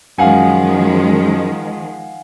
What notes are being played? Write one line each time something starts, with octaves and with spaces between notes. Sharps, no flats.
F#2 D#3 F3 G#3 F5 F#5 G#5